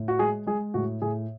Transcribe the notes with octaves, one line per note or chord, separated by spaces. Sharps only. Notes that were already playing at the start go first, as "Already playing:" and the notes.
Already playing: A2
F#4
G#3 G#4
G#3 G#4
A2 F#4
A2 G#4